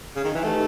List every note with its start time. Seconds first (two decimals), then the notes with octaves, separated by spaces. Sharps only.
0.16 C#3
0.25 D#3
0.34 E3
0.44 A3 D#4 G4 B4 D#5 F#5